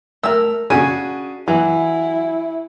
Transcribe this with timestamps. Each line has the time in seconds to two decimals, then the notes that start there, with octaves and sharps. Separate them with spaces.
0.23 A3 A#4 E6
0.70 C#3 D4 F#4 G#5
1.48 E3 F#3 E4